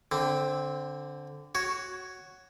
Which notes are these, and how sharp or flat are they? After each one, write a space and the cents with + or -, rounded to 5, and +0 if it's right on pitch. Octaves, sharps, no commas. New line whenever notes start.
D3 -10 C4 +0
F#4 +5 C#5 +0